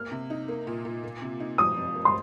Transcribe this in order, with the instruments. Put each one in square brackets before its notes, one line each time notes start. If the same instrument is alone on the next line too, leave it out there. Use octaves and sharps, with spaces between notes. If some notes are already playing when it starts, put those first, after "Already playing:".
Already playing: [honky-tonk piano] A#3 [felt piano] F6
[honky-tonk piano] C3
D#4
A#3
A#2
A#2
A#3
C3
D#4
[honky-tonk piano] F3 [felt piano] D#6
[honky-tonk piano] F2
A#3
[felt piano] C6